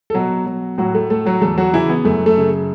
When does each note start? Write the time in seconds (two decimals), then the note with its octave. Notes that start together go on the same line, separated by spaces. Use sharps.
0.10 A4
0.14 B2 F#3 F#4
0.46 F#3
0.78 A2 F#3 F#4
0.95 A3 A4
1.10 A3 A4
1.26 F#3 F#4
1.41 E2 A3 A4
1.58 F#3 F#4
1.73 C#3 E3 E4
1.90 B3
2.05 F#2 A3
2.26 A3 A4
2.37 C#3